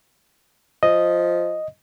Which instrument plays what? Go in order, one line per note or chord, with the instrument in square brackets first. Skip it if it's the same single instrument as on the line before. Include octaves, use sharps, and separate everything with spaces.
[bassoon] F3 [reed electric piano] D#5